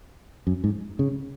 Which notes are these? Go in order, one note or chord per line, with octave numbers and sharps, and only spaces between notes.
F#2
G#2
C#3